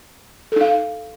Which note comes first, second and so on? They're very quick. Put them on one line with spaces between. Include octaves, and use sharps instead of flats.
A4 D#4 F5